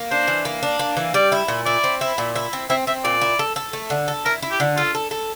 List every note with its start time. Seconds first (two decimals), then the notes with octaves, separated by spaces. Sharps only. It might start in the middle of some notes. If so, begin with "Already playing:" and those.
Already playing: A#3
0.11 D4 C5
0.28 E3
0.45 A#3
0.63 D4
0.79 A#3
0.97 E3
1.14 G3 D5
1.32 E4
1.48 A#2
1.66 E4 D5
1.84 C4
2.01 E4
2.18 A#2
2.36 E4
2.53 C4
2.70 C4 E5
2.87 C4 E5
3.04 A#2 D5
3.22 E4
3.39 A4
3.56 A4
3.73 A3
3.90 D3
4.08 A4
4.25 E4 A#4
4.42 E4
4.51 G4
4.60 D3
4.77 F4 A4
4.95 A4
5.11 A4